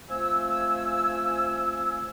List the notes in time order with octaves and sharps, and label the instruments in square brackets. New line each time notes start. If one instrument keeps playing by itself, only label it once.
[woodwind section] F3 A3 C4 G#5 E6